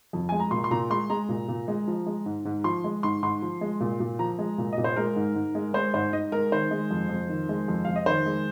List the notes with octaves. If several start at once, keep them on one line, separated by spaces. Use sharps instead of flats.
F2
G#3 G#5
A#5
A#2 C6
C6
A#2 A#5
G#3 C6
G#3 A#5
A#2
A#2
G#3
F3
G#3
G#2
G#2
F3 C6
G#3
G#2 C6
G#2 C6
F3
G#3
A#2
A#2
F3 A#5
G#3
A#2
D#5
A#2
C5
G#3 A#4
G#2
G#2
G#3
G#3 C5
G#2 C5
G#2 D#5
G#3 A#4
D#3 C5
G#3
F2
F2
D#3
G#3
F2
F2 F5
D#5
D#3 C5
G#3